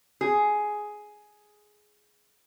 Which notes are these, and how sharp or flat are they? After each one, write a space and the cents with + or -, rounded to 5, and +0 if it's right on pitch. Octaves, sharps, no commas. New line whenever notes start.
G#4 +10